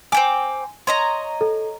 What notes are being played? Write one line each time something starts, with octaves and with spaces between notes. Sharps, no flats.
C4 G5 G#5 D6
C#5 D#5 A#5 C6
A4